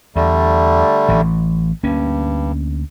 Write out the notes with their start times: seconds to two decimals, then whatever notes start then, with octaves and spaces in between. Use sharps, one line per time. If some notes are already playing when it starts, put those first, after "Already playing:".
0.16 E2 D3 G3 A3
1.09 A1 E3
1.83 D2 G2 A#3 C#4